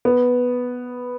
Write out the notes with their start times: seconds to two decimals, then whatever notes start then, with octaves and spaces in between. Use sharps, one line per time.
0.05 B3